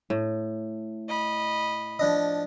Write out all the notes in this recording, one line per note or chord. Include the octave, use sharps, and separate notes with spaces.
A2
D#5 B5
F3 D4 D#5